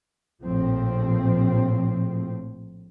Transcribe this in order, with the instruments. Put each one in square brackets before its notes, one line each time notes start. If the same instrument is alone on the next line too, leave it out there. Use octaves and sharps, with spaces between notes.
[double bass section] A#1 A2 F3 C4